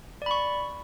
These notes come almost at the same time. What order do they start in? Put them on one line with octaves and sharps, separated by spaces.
D5 B5 C#6